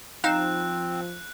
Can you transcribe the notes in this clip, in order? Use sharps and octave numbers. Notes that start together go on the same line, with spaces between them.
F3 C4 D#4 F5 F#6 E7